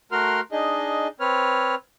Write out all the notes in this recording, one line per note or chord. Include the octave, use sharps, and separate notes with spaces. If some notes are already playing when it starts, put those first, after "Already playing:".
A3 F#4 A#4 C6 F6
D4 D#4 G#4 D#5
C4 B4 C#5 F6